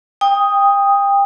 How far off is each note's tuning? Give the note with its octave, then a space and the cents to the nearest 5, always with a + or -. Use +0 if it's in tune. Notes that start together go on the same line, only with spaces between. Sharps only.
G5 +30 D#6 +0